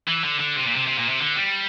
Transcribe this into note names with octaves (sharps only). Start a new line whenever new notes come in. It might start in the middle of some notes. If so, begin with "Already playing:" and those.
E3
D3
D3
C3
A#2
C3
C3
A#2
C3
D3
G3